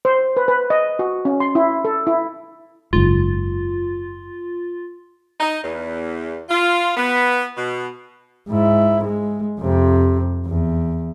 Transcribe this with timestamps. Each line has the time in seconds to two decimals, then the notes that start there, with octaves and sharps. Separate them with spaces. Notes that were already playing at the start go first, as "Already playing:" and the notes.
0.05 C5
0.37 B4
0.48 B4
0.70 D#5
0.99 F#4
1.25 C#4
1.40 C6
1.55 E4
1.85 A4
2.07 E4
2.93 F#1 G#2 F4
5.40 D#4
5.63 E2
6.49 F4
6.97 B3
7.56 B2
8.49 G#2 E4
9.04 G#3
9.60 F2 C3
10.46 E2